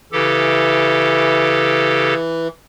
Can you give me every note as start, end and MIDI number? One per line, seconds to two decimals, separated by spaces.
0.12 2.14 49
0.12 2.48 52
0.12 2.14 67
0.12 2.14 69